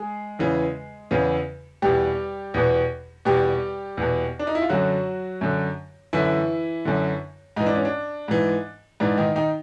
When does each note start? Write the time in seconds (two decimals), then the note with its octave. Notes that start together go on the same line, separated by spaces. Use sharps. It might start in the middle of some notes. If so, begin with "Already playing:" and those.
Already playing: G#3 G#4
0.39 E2 C#3 E3
1.11 E2 C#3 E3
1.82 E2 B2 G3 G4
2.54 E2 B2
3.25 E2 B2 G3 G4
3.97 E2 B2
4.39 D4
4.47 D#4
4.55 E4
4.62 F4
4.69 F#2 D3 F#3 F#4
5.41 F#2 D3
6.13 F#2 D3 E3 E4
6.85 F#2 D3
7.56 G#2 E3 D#4
7.66 D4
7.75 C#4
7.85 D4
8.28 G#2 E3
9.00 G#2 E3 D4
9.17 D#3 D#4
9.35 D#3 D#4